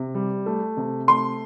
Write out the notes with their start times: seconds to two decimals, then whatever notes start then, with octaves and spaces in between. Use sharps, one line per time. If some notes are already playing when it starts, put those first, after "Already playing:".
Already playing: C3
0.15 G3
0.46 A3
0.77 C3
1.08 A3 C6